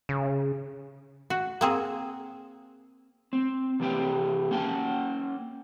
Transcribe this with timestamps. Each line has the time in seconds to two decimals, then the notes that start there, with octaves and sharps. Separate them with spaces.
0.09 C#3
1.30 F#4
1.61 A#3 C4 G#4
3.33 C4
3.80 C3 E3 G4 G5
4.51 A#3 C#4 G5 A5